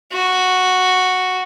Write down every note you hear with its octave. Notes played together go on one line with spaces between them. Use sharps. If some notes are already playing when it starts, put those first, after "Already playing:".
F#4